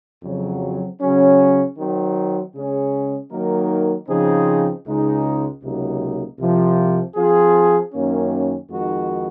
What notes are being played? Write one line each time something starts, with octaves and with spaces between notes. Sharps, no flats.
F2 C#3 F#3 C4
C#3 F#3 C#4
D#3 F#3 C4
C#3 G#3 C#4 G#4
D#3 F#3 A#3 D#4 A#4
C#3 F3 C4 D#4 G#4
C#2 C#3 G#3 D#4
C#2 C3 F#3 A#3 D#4
C2 C3 F3
F3 C4 F4 G#4
F#2 D#3 A#3 C#4
F2 D#3 G#3 D#4 F#4